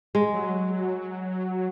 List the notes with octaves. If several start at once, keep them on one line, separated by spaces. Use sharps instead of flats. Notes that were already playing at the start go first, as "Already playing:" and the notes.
G#3
F#3